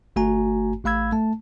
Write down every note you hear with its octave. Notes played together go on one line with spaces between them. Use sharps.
G1 A3 F#4 G#5 A#5
A1 A3 F5 B5 E6 G#6
A3 A5